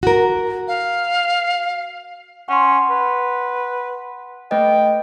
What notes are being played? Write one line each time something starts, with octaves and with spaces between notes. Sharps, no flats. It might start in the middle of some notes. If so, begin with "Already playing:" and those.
F#4 A#4
F5
C#4 F#5 C6
B4
A3 B4 D#5 G5